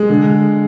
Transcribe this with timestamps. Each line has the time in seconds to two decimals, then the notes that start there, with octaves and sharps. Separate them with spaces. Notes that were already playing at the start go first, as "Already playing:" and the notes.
Already playing: G#3
0.10 D3